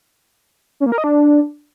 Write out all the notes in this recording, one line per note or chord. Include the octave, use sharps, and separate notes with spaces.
C#4
A#3
A#4
D#5
D4